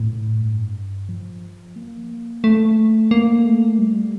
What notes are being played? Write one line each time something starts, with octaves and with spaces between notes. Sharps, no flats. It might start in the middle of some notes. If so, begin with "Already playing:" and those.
Already playing: A2
G2
F3
A#3
A3
A#3
A3
G3